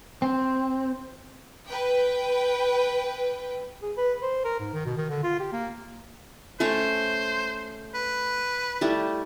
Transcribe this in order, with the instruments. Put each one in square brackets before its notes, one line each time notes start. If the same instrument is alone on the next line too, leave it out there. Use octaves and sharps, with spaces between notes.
[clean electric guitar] C4
[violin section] B4 G5
[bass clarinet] G#4
B4
C5
A#4
G#2
D#3
B2
D#3
D3
F4
G4
A#3
[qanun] A3 C#4 C#5 [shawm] C5
[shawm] B4
[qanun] G3 A3 E4